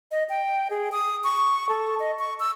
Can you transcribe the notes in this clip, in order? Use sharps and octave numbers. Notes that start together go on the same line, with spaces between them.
D#5
G5
G#4
D#6
C#6
A4
D#5
C#6
E6